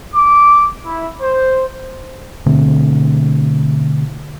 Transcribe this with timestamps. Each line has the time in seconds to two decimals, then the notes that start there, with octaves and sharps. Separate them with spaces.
0.14 D6
0.85 E4
1.20 C5
2.46 B2 D3 A3 C4